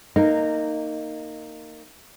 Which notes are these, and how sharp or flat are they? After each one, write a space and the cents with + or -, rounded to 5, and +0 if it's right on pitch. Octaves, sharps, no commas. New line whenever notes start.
A#3 -15 D#4 -5